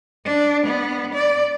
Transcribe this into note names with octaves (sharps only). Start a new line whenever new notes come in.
D4
B3
D5